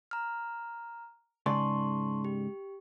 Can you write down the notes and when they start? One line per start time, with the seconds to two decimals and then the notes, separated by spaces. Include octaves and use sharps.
0.11 A#5 F6
1.46 G#2 C#3 D5 A5 C6 C#6
2.25 G4